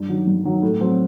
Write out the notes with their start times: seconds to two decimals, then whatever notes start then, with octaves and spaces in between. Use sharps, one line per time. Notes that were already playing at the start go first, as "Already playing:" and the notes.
Already playing: G2
0.09 D#3 F#3
0.27 G2
0.45 D#3 F#3
0.62 A2
0.80 F#3 C4